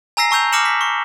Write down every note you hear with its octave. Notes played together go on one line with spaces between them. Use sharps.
G#5 A#5 E6 A#6 C7
A5 C#6 E6 G6 F7
D6 F6 A#6 C#7 E7 F#7
B6
C#6